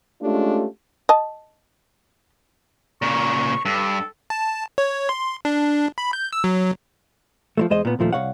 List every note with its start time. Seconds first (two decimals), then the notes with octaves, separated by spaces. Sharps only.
0.22 G#3 A3 C#4 D4 F4 G4
1.09 D#5 A5
3.02 A#2 C#3 C#6
3.65 G2 A4
4.30 A5
4.78 C#5
5.09 C6
5.45 D4
5.98 B5
6.13 G6
6.33 E6
6.44 F#3
7.57 F3 G#3 A3
7.70 E2 G#3 C5 D#5
7.85 A#2 B3
7.99 D#2 A#2 F3 A3
8.13 C2 F#3 C#5 F5 F#5